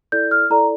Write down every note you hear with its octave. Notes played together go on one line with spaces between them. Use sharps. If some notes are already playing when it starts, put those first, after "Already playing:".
E4 A4 D5 G6
F6
E4 A4 D5 A#5